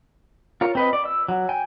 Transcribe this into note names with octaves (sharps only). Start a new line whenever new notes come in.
F4 A#4 C#5
C4 B4 D#5
D5
E6
F#3
G5 G#5